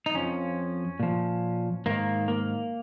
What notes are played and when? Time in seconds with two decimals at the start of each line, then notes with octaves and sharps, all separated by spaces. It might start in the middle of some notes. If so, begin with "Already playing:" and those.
0.06 D#4
0.14 F2 F3 C#4
1.00 A#2 F3
1.86 G#2 D#3 A#3
2.28 A#3